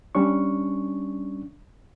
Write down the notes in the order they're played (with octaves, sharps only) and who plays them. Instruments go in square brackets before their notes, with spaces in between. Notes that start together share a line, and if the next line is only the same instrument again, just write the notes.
[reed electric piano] G3 C#4 D4 C#6